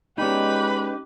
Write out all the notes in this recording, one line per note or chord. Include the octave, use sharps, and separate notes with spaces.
G#3 C#4 D#4 G4 B4 B5